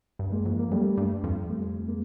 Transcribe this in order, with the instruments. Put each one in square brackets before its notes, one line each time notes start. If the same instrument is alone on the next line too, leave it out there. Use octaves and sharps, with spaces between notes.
[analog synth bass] G2
[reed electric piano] G#3 A#3
[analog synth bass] F2
[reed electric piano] A#3
[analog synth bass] F#2 [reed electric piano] G3 A3
[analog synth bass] G2
F2
[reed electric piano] G3 A3
G#3 A#3